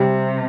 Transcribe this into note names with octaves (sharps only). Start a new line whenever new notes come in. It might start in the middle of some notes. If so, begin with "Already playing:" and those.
Already playing: C3 G3